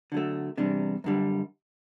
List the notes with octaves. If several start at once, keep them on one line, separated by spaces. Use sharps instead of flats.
D3 F#3 A3
E2 C3 G3 D4
F#2 D3 G3